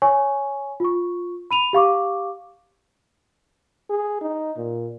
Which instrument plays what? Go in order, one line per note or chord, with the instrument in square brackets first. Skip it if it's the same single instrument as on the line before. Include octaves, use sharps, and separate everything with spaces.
[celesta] C#5 G#5 C#6
F4 C#6
B5 D#7 F7
G4 F5 C#6 D6
[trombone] G#4
D#4
A#2